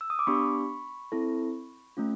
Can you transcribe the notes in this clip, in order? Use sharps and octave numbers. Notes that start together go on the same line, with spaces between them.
E6
D#6
D6
B3 D4 G4 B5 C#6
C4 E4 A4
A3 C#4 F4